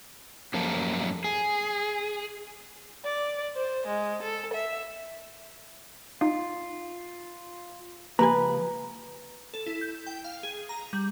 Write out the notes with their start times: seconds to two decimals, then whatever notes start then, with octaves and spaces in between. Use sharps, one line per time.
0.54 F#2 F3 A#3 G4 A4
1.24 G#4
3.04 D5
3.56 C5
3.87 G#3
4.22 A4
4.53 E5
6.21 D#4 F4
8.19 C#2 F3 A#3 G4 B4 G#5 A#5
9.54 A4
9.66 E4
9.81 G6
10.07 G5
10.24 F5
10.43 G#4
10.69 A#5
10.93 G3